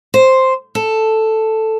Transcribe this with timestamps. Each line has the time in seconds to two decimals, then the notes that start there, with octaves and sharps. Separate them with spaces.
0.14 C5
0.75 A4